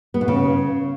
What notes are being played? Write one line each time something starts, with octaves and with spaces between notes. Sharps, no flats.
B3
B2
C#3